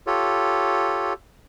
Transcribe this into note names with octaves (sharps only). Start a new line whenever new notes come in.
F4 G4 A4 C#5